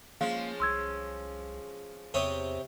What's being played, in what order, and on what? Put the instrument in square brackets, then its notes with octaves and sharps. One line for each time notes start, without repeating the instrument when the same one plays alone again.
[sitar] F3 G#3 C#4 [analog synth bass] A#3 [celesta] F5
[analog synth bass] C2 [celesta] C6 E6 G#6
[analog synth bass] E2 [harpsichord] C3 C#5 D#6